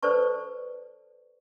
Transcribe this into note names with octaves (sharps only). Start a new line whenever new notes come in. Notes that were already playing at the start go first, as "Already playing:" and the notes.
A4 B4 C5 D5 A5 C#6